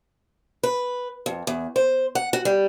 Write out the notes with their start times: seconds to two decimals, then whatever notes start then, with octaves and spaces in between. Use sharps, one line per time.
0.63 B4
1.26 F2
1.47 E2
1.76 C5
2.15 F#5
2.33 F#4
2.45 G3